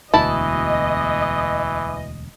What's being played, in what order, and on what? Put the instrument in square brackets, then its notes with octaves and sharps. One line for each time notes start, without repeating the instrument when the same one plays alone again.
[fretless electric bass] E1 D2 B2 [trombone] E3 [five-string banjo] E4 A5 [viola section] D#5